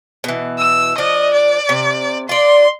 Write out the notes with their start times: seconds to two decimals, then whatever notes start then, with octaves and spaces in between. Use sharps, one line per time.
0.24 B2 E3
0.58 E6
0.98 F3 D4 D#5
1.33 D5
1.69 C3
2.29 F4 D5 C6